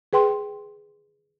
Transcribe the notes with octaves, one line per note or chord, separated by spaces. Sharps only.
G#4 B4 G5 C6